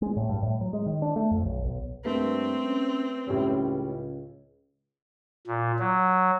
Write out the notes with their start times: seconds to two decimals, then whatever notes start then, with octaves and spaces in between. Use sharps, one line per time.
0.02 G#3
0.17 A2
0.29 G2
0.43 A2
0.61 F#3
0.73 G#3
0.86 D#3
1.02 D4
1.16 A3
1.31 F2
1.45 B1
1.64 B1
2.05 G2 A3 A#3 C4 B4
2.64 C#4
3.27 C#2 A2 G3 C#4
5.47 A#2
5.80 F#3